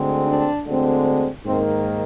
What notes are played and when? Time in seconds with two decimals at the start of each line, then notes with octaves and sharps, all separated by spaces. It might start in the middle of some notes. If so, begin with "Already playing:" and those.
Already playing: D2 D3 G#3 C4
0.26 D4
0.65 D2 D3 G#3 C4
1.45 G#2 D#3 A#3 C4